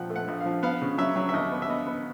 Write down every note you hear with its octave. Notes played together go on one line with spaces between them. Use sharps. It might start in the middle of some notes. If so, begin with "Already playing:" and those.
Already playing: A#1 A#2 F3 F#5 G5
A3
F#5
A#1
F5
F3
B3 F5
C#3
F#3 E5
F#3
E5
D#2 D#5
B3
E5
B3 D#5
B3